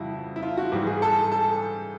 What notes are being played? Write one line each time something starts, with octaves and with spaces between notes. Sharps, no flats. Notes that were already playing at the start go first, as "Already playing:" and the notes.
Already playing: F2 C#3 E3 G3 E4 F#4
E4
F4
F#4
G#2 E3 G3 G4
G#4
A4
A4